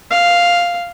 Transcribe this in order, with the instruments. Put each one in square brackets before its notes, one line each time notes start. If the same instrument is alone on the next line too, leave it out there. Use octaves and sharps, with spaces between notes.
[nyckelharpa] F5